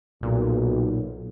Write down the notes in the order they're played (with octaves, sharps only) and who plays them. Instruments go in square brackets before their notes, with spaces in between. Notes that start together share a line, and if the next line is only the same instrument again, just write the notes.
[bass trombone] B1 [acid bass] A#2